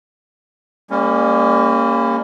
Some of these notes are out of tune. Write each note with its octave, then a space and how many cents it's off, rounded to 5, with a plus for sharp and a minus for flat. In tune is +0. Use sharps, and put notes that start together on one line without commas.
G3 +40 A#3 -10 C#4 +0